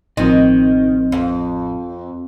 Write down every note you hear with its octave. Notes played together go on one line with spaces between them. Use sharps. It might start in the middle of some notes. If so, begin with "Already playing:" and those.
A1 A2 D#3 F3 C4 D#5
F2